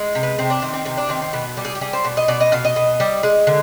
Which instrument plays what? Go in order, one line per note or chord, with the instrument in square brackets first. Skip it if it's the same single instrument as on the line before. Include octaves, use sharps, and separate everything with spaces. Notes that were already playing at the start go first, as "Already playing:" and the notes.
Already playing: [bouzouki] G#3
C3
B3
C3 C4
D4
D#3 C4
C4
C3 C4
D4
D#3 C4
C4
B2 B3
G3
G#4
G4
G3 G#4
C5
B2
D#5
B2 D5
D#5
B2 F5
D#5
B2
G3
G#3
D3